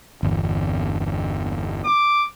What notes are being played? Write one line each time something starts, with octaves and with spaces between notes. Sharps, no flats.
G1 E2
D6